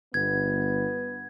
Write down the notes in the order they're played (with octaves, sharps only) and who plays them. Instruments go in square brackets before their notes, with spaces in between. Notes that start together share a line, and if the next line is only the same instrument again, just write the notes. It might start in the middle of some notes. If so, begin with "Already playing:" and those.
[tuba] G1 [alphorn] B3 [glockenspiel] G#6